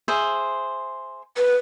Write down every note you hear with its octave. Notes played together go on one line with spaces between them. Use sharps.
G#4 C5 E5
B4